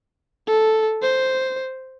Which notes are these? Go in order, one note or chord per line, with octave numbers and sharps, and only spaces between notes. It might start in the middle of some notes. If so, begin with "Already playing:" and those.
A4
C5